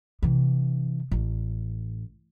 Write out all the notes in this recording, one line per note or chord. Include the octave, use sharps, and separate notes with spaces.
C3 E3
A1